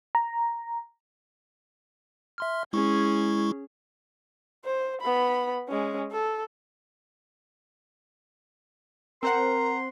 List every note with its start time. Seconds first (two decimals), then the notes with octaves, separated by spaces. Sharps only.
0.15 A#5
2.38 E5 C6 F6
2.73 G#3 C#4 E4 G#4 C#6
4.64 C5
5.01 B3 B5
5.69 G#3 C#4
6.11 A4
9.23 C4 A#4 C5 F#5 A#5 C6